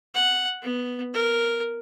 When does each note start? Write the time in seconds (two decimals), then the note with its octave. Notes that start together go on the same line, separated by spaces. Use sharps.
0.15 F#5
0.62 B3
1.13 A#4